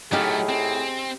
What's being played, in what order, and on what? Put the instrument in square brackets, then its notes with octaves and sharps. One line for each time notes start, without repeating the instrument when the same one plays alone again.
[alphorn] A2 [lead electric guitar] F#3 A3 [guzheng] D#4 G4 F5 [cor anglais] G#4
[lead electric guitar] C4